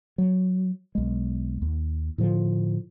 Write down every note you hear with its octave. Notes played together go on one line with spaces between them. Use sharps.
F#3
B1 G#3
D#2
A2 D3 F3